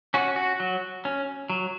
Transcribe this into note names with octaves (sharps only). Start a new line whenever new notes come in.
C#4 F#4
F#4
F#3
C#4
F#3